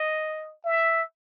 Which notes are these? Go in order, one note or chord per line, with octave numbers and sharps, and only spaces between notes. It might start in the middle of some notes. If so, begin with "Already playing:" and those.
Already playing: D#5
E5